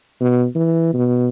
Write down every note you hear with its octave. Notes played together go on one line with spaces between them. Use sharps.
B2
E3
B2